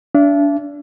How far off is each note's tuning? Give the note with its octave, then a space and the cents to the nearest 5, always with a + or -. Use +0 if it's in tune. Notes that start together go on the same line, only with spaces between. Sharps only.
D4 -25 E5 +35